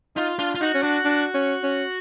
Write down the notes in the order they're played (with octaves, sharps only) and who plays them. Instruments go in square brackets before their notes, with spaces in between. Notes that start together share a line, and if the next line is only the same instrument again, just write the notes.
[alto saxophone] D#4 [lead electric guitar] F4
[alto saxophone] D4 [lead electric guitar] F4
[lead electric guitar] F4
[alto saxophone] D#4 [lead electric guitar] F#4
[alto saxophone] C#4
[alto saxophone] D4 [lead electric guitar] F#4
[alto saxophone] D4
C#4
C#4